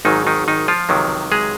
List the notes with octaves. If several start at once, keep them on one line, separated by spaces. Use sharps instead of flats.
G#1 G#2 D#3 F#3 D#4
D#3 D#4
D#3 D#4
F3 F4
C#2 C3 D#3 F#3
G#3 G#4